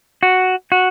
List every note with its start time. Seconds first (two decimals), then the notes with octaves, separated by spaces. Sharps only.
0.23 F#4
0.72 F#4